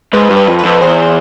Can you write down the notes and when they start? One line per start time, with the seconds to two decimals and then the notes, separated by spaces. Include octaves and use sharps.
0.13 G#2 B4
0.30 G2
0.36 B4
0.48 F2
0.59 B4
0.64 F2
0.81 E2 C5